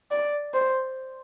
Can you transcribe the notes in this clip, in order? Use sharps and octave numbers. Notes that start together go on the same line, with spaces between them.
D5
C5